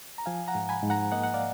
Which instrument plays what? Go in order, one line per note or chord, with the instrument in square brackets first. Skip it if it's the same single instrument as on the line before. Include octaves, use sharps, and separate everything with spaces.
[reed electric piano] A#5
F3 F5 G#5
F#5 A#5
G#2
G#5 B5
G#2
F#5 A#5
A#3 D#5 F#5
F#5
D5 F5